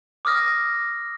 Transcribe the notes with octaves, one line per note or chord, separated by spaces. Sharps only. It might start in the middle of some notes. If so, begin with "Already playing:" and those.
D6 D#6 F6 A#6